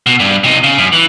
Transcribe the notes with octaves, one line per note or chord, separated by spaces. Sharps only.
B2
G2
C3 D#4
C#3
F#2
E3